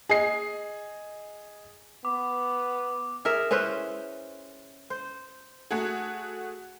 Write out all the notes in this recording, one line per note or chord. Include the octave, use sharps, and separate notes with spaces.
G#4 D#5 C7
B3 D6
G#4 A#4 E5
C#4 E4 B4 C5
C5
A3 F#4 G#4